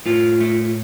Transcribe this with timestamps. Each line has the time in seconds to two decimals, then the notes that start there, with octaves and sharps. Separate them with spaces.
0.06 A2 F4
0.41 A3